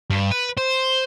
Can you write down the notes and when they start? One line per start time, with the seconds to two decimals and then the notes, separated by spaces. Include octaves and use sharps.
0.10 G2
0.31 B4
0.57 C5